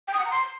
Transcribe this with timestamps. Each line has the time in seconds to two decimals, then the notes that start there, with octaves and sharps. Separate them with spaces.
0.08 G5
0.14 D#6
0.19 F#5
0.25 A#5
0.31 C6